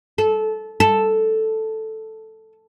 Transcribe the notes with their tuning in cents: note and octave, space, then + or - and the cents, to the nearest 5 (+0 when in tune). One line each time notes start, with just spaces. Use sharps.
A4 -20
A4 +0